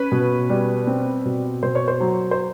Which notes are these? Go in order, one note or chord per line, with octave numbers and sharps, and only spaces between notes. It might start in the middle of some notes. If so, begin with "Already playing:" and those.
Already playing: C#4 B4
B2
G3
C4
B2
B2 C5
C#5
C5
F#3
C5